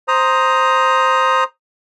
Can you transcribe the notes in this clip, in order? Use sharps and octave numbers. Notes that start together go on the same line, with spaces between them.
C5 A#5 D#6